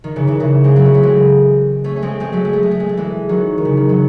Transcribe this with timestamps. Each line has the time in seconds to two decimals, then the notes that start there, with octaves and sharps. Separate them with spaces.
0.04 D#3
0.16 C#3 E3
0.27 C#3 E3
0.40 C#3 E3
0.64 G#3 C4
0.76 F#3 A3
0.85 C#3
0.94 F#3 A3
1.03 G#3 C4
1.84 A3 C#4
1.96 C#4
2.02 G#3 C4
2.20 G#3 C4
2.32 F#3 A3
2.45 G#3
2.53 A3
2.63 G#3
2.71 A3
2.80 G#3
2.89 A3
2.97 E3 G#3
3.29 D#3 F#3
3.58 D#3
3.65 C#3
3.77 D#3
3.89 D#3 F#3